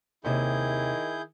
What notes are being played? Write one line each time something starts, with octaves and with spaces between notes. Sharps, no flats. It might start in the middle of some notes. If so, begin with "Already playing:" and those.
D#2 C3 D#3 E4 G#4 G6